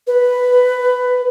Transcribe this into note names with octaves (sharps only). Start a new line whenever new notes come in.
B4